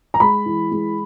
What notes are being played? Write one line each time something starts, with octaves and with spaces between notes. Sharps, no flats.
A#5
G#3 B5
E3
G#3